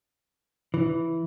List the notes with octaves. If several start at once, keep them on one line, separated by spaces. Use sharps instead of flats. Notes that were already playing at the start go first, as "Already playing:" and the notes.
E3